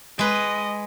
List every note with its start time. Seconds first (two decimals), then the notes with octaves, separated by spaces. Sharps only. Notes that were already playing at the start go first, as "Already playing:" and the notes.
0.19 G#3 B4 D#5